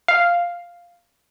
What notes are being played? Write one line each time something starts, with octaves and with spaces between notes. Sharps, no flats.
F5